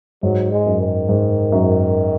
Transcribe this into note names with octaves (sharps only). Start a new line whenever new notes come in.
G#2 F#3
G#3
F#2
D#3
G#2
F#2